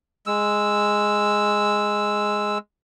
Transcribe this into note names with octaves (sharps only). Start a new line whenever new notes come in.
G#3 E6